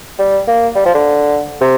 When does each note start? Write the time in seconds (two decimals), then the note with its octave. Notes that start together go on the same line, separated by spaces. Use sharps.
0.19 G3
0.48 A#3
0.75 G3
0.85 F3
0.94 D3
1.61 C3